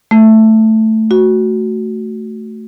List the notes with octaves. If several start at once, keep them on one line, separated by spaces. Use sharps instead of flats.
A3
F#4